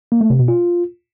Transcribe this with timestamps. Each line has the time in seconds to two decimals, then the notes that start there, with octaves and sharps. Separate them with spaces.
0.12 A#3
0.21 A3
0.30 C3
0.39 B2
0.48 F4